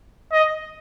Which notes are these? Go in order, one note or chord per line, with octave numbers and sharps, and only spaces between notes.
D#5